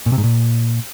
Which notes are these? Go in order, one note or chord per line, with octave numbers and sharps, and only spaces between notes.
A#2
C3
G#2
A#2